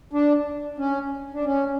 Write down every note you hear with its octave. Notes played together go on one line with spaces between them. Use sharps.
D4
C#4
D4
C#4